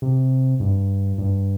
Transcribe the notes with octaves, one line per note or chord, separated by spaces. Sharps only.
C3
G2
G2